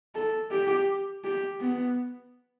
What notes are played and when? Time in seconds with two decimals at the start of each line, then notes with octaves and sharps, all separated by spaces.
0.15 A4
0.51 G4
1.24 G4
1.60 B3